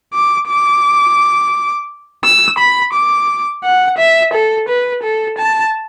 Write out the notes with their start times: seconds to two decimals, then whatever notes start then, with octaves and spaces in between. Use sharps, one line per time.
0.14 D6
0.48 D6
2.24 E6
2.58 B5
2.94 D6
3.64 F#5
3.98 E5
4.34 A4
4.69 B4
5.03 A4
5.38 A5